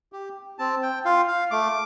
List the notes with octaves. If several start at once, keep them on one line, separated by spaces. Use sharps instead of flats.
G4
C4 A5
G5
F4 F5
F5
A3 D6